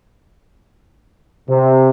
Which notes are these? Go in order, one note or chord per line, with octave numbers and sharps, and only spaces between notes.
C3